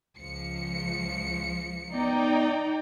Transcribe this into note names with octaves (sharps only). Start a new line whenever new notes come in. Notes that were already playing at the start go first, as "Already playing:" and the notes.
C#2 F3 C#7
B3 D#4 D5 G5 A#5